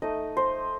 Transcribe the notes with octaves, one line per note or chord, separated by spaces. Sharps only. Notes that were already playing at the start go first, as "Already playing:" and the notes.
A3 D#4 D#5
C5